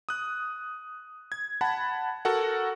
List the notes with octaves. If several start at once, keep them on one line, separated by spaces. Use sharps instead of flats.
D#6 F#6
G#6
F#5 A5 B5
F#4 A4 A#4 F#5